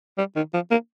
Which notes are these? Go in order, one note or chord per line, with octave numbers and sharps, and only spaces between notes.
G3
D#3
F3
A#3